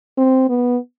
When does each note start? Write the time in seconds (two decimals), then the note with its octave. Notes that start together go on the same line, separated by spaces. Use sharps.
0.18 C4
0.49 B3